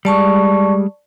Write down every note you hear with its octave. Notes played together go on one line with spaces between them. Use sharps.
G3 G#3 D5 A5 C#6